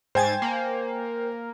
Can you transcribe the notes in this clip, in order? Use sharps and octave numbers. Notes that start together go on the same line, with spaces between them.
G#2 C5 G5 G#5 G#6 A6
A#3